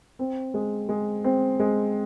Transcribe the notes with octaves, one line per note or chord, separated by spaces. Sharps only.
C4
G#3
G#3
C4
G#3